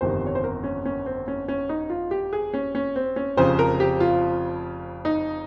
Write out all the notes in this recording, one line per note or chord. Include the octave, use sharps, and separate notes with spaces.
G1 F2 C3 D#3 C5
C#5
C5
A#4
C#4
C#4
C4
C#4
C#4
D#4
F4
G4
G#4
C#4
C#4
C4
C#4
F1 F2 C#3 F3 C5
A#4
G4
F4
D#4